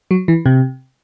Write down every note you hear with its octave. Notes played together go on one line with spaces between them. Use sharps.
F#3
E3
C3